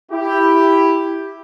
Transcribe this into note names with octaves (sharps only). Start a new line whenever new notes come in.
E4 G4